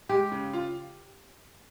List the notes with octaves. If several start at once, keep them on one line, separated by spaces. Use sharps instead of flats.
G#3 G4
C#3
F4